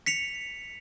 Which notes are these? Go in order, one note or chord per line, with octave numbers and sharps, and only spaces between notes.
B6 C#7 F7